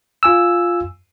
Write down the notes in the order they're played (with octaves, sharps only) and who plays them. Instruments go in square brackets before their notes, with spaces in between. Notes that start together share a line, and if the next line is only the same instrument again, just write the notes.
[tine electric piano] F4 G#5 E6